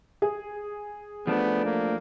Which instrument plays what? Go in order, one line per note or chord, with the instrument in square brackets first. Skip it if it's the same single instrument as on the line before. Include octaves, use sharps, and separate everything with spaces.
[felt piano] G#4
[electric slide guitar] F3 A3 D4 [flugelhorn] B3
[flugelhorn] A#3